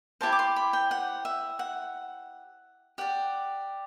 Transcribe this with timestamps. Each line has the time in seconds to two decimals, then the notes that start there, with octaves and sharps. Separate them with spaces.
0.21 E4 G4 C5 A5
0.32 D6
0.39 C6
0.56 B5
0.73 G5
0.91 F#5
1.25 E5
1.59 F#5
2.98 G4 D5 F#5